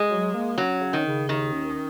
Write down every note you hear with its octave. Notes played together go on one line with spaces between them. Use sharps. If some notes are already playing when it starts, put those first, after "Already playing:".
Already playing: G#3
F#3
A#3
F#3 C#4
C#3
D#3
C#3
D#2 D#3
C#4